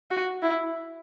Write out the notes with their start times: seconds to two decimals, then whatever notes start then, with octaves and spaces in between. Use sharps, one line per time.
0.11 F#4
0.42 E4